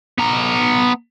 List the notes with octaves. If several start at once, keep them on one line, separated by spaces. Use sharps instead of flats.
B3 A#5